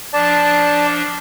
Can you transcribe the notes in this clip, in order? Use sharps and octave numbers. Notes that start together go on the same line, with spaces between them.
F3 D4 D5 A5